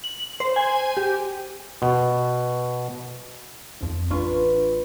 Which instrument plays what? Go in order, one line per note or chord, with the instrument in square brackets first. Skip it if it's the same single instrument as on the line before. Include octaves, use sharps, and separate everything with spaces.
[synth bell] F#7
C5
G#5
G4
[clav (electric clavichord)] B2
[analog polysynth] G#1 F2
[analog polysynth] A1 D4 F4 [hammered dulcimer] B4 C#6